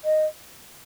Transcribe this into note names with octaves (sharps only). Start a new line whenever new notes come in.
D#5